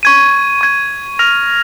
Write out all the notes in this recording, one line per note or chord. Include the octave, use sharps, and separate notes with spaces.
C#6 G#6 D#7
C#6 G#6 D#7
F6 A#6 F7